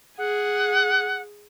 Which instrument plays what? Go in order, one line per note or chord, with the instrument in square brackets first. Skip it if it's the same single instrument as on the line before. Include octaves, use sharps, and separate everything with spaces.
[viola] G#4 [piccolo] F#5